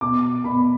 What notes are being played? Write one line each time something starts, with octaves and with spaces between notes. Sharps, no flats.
B2 D6
B2 B5